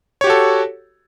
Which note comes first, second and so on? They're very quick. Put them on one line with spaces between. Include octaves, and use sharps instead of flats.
C#5 G4 F#4 A4